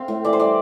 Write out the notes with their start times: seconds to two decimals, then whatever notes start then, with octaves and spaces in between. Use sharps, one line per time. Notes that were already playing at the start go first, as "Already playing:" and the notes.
Already playing: C4 F5
0.08 A2
0.24 E3 D5
0.33 C5
0.40 G3 D5